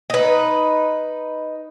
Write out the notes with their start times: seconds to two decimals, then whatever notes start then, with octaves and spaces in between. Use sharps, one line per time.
0.10 D#4 B4